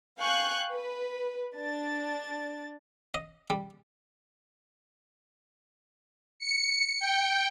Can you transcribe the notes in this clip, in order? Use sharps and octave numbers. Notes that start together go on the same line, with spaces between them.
F5 G5 G#5 C#6 F#6 G6
B4
D4 A6
D#5
G3
C#7
G5